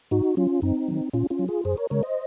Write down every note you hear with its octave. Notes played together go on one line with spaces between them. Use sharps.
G#2 D#4 F#4
F#3 C#4 F4
F#2 C4 D#4
D#3 F#3
A#2 C#4 F4
C#4 F4
F#3
F4 G#4
F#2 G#4 C5
A#4 C#5
C#3 G#3 A#4 C#5
C5 D#5